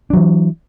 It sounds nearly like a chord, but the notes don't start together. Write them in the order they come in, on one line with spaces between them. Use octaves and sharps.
D4 F#3 E3